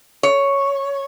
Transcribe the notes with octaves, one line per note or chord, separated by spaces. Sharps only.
C#5